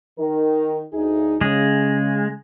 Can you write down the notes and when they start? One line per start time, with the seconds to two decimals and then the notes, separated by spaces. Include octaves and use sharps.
0.19 D#3 A#4
0.93 D2 D#4 G#4
1.41 C#3 G#3